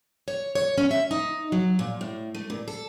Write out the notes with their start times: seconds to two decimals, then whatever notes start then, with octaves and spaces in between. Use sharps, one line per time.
0.28 C#5
0.55 C#5
0.78 C#4
0.91 E5
1.11 D#4
1.52 F#3
1.79 A#2
2.01 A2
2.35 A3
2.50 A#2
2.68 A4